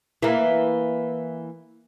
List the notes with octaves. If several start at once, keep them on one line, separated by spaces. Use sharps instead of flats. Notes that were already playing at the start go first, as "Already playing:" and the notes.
E3 A#3